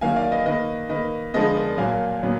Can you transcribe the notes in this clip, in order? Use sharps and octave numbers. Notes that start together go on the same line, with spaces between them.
D#3 F#3 A#3 F5 G#5
D5 F5
B4 D#5
D#3 A#3 B4 D#5
D#3 A#3 B4 D#5
D3 F3 G#3 B3 B4 D#5
A#4 D5
A#2 F#3 A#3 F5 G#5
A#2 F#3 B3